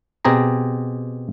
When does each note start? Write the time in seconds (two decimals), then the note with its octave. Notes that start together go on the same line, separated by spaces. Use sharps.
0.25 B2 C4 G4 G#4 A#5